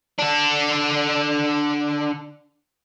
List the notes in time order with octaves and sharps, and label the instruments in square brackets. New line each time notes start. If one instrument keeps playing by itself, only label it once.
[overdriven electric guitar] D3 D4